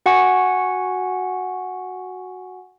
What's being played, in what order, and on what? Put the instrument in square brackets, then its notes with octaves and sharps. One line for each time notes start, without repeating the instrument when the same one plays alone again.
[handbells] F#4 F#5 G#5 C#6